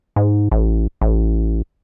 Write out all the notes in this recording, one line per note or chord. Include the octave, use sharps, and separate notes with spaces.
G#2
A1
A1